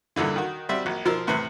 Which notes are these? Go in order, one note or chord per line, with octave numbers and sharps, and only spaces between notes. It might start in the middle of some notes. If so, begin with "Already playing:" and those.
E2 G2 A#2 D3 E3
D#3 F#4
G3 C4 F#4 E5
A#1 F#3
B2 F3 A#4 C6 E6
E2 A2 C3 B4